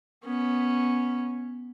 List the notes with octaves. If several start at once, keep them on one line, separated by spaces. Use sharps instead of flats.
B3 C#4